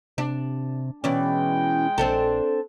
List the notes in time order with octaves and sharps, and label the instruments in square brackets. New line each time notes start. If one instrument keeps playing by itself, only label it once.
[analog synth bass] C3 [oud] D4
[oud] B2 E3 D5 [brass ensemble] G#3 G5 [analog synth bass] C#4
[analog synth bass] A#1 [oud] C4 D4 A4